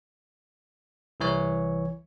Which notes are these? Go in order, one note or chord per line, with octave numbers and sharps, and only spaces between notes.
C2 E3 C#5